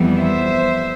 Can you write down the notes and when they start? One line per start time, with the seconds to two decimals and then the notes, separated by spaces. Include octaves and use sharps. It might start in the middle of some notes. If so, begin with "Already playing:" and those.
Already playing: F2 E3 G3 B3
0.17 C5 E5